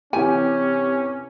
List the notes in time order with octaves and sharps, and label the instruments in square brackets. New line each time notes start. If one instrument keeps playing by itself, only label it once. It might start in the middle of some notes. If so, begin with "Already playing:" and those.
[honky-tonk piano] C3 E3 G4 [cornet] C#4 [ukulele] G#5